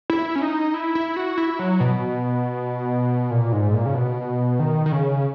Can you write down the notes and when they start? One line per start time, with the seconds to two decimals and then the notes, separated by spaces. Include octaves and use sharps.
0.10 E4
0.36 C#4
0.42 D#4
0.74 E4
0.95 E4
1.16 F#4
1.38 E4
1.59 F#3
1.80 B2
3.31 A#2
3.52 G#2
3.74 A#2
3.86 C#3
3.95 B2
4.59 D#3
4.86 D#3
4.92 C#3